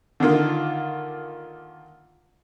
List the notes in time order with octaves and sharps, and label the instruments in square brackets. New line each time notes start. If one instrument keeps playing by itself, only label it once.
[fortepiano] D3 D#3 A#3 F4